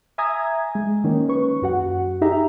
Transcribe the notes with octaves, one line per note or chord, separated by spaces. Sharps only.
E5 G#5 A#5 D#6 G#6
G#3
D#3 A#3 C#4
B4 C#6
F#2 F#4 F#5
D#4 G4 G#4 E5 A#5